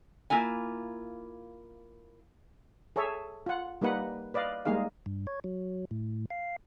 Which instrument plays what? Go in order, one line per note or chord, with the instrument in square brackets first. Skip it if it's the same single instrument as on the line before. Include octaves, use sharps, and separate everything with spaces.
[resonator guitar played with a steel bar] A#3 E4 F4 G#5
[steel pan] G#4 A4 C#5 E5
F4 F#5
G3 A#3 D#4 B4 F#5
B4 D5 D#5 F5
G3 G#3 A#3 D#4 G#4 F5
[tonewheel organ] G2
C#5
F#3
A2
F5